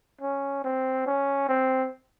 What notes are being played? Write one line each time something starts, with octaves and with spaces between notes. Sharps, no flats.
C#4
C4
C#4
C4